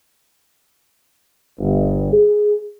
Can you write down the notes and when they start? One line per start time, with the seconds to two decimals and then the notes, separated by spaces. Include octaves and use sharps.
1.59 G1
2.12 G#4